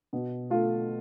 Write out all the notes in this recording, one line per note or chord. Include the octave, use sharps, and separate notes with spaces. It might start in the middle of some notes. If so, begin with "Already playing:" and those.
B2
A3 F4 A4